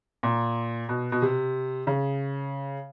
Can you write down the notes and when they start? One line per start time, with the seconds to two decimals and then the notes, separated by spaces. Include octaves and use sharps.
0.23 A#2
0.89 B2
1.12 B2
1.22 C3
1.87 C#3